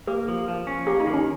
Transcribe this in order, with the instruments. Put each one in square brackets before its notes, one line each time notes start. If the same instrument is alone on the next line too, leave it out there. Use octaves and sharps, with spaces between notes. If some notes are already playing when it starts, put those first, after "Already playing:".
[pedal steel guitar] A#3 [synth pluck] G4
[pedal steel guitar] F3
F3
C#4
[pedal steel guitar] A#3 [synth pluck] G4
[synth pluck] D#4
[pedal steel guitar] D#3
[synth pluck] C#4